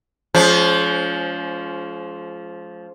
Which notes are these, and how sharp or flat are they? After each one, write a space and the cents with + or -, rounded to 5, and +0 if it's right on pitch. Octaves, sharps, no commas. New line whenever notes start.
F3 +0 G#3 +40 C#4 +30